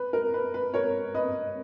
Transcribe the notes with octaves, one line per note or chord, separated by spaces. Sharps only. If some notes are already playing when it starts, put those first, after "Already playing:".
Already playing: B4
A#4
B4
B4
A#4 C#5
B4 D#5